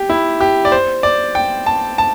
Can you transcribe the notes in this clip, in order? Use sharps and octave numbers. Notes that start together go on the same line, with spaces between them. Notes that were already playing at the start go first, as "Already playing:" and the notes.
Already playing: G4
E4
G4
D5
C5
D5
G5
A5
A5